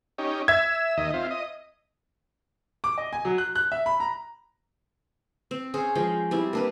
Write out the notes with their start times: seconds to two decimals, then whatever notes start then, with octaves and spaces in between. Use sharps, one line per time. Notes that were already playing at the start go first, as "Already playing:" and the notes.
0.18 C#4 D#4 G4
0.48 E5 E6 G#6
0.97 D#2 D#5
1.14 C4 F4
1.31 D#5
2.84 D6
2.98 D#5
3.13 G#5
3.25 F#3
3.38 F#6
3.55 F#6
3.72 E5
3.86 B5
4.00 A#5
5.51 C4
5.74 C#4 G#4 C5
5.95 F3 G#3 G5
6.31 G3 C4 E4
6.53 A#3 D4 B4